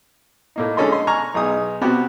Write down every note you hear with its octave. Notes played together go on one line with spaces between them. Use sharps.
A2 A#3 D#4
D3 G#3 C#4 A4 D#5 C6
D#5 C6
G#5 A#5 C#6 F6
B1 D#4 G#4 D#6
C3 B3 F#4 G4